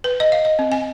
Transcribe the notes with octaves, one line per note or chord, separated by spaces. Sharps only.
B4
D#5
F5
D#5
C4
G#5